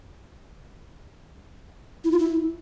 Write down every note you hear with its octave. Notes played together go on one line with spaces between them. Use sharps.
E4
F4
E4